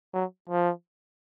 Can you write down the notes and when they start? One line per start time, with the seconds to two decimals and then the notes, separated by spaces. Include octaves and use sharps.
0.13 F#3
0.49 F3